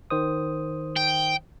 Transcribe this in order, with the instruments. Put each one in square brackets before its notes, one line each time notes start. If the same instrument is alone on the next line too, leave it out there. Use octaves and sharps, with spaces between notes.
[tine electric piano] D#3 C5 D#6
[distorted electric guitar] G5